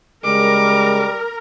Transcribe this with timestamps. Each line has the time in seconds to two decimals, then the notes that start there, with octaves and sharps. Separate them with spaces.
0.24 C#3 G3 G#3 A#4 D6